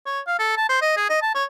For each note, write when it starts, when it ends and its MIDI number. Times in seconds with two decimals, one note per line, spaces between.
0.06 0.20 73
0.27 0.38 77
0.39 0.56 69
0.57 0.66 81
0.69 0.77 72
0.82 0.93 75
0.97 1.08 68
1.10 1.18 75
1.22 1.32 81
1.35 1.44 73